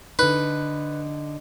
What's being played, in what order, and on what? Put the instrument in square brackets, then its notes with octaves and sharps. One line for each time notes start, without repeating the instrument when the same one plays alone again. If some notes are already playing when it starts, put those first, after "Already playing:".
[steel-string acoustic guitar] D3 D#4 [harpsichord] B4